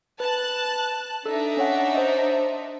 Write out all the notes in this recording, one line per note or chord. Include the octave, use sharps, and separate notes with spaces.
B4 A5 F#6
D4 D#4 A4 E5
C#4 C#5 F#5
C5 D#5